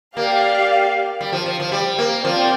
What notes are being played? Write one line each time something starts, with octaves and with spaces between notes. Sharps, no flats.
A#3 G4 D5 F5
G3
F3
F3
F3
G3
A#3
F3 C4 F4 D5 G5